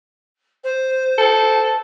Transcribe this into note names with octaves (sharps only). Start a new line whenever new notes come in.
C5
A4